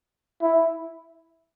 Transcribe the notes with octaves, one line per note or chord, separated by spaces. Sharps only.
E4